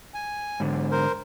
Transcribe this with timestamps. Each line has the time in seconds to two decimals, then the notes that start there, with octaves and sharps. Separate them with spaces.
0.14 G#5
0.60 G#2 D3
0.91 A#4 C5